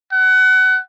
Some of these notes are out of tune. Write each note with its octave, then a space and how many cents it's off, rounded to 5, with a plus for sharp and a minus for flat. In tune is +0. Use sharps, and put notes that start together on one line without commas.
F#5 +25